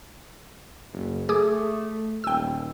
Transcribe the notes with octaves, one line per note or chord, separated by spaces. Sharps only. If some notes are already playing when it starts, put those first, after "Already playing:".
F#1
A3 G#4 D6 D#6
D#1 G5 E6